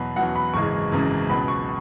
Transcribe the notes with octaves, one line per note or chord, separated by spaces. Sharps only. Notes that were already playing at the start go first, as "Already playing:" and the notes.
Already playing: E2 B2 F#3 B5
E2 B2 F#3 F#5
B5
G#1 F#2 C#3 E3 G#3 C#6
G#1 F#2 C#3 E3 G#3
C#2 B2 F#3 B5
C#6